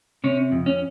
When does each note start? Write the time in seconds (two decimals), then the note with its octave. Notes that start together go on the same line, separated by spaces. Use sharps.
0.24 C3 C#4
0.52 F2
0.66 C#4